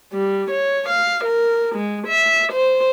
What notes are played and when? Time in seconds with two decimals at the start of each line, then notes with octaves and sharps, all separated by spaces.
0.13 G3
0.51 C#5
0.89 F5
1.24 A#4
1.75 G#3
2.07 E5
2.52 C5